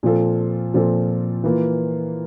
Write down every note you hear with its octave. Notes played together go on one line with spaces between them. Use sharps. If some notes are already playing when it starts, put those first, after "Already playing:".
A#2 F3 C4 F4 A4
A#2 F3 C4 F4 A4
E3 A#3 F4